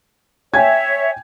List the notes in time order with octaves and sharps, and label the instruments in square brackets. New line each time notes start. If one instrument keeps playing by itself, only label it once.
[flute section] C#5 E5 [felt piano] G5 G#5 G#6